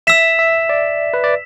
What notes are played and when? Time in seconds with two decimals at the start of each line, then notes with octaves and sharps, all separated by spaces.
0.07 E5 E6 B6 E7
0.39 E5
0.69 D5
1.14 B4
1.24 D5